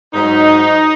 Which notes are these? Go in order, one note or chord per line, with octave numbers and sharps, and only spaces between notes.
G#2 F#3 D#4